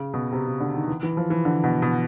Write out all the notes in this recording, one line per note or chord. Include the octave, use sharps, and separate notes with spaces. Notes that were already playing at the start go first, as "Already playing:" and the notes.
Already playing: C#3
B2
C3
C#3
D3
D#3
E3
E3
F3
E3
D3
B2
B2